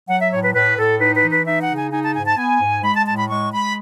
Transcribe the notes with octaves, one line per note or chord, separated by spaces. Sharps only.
F#3 F#5
E5
A2 C#5
B4
A2 B4
A2 A4
D#4 B4
B4
E3
B4
D#4 E5
F#5
C#3
G#5
D#4 G#5
A5
G#2 G#5
A5
B3 G#5
G#2
G#3 B5
A5
A2 A5
B5
G#3 C#6
G#3 B5